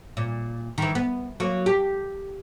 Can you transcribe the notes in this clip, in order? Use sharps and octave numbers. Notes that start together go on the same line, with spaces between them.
A#2
D#3 E3
B3
F#3 A#3
G4